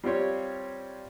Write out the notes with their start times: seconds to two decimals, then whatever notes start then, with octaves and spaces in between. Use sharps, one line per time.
0.04 G3 C4 F4 G4 C#5